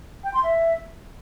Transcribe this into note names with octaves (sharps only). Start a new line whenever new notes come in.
G5
C6
E5